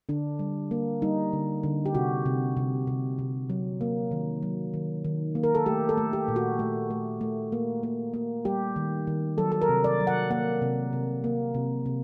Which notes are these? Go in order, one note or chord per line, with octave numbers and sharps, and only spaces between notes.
D3 D4
G3
A#3
G3 D#4
D3
D3
G4
C3 F#4
C3
C3
C3
C3
F#3
A#3
D#3
F#3
D#3
D#3
A#3
A#4
A4
A3 G4
A4
A3
G4
A#2
F#4
A3
A3
A3
A#3
A#3
A#3
G3 G4
D#3
D#3
F#3 A4
A4
A#4
C3
D5
F#3
F#5
A#3 F#5
C3
C3
A#3
C3
C3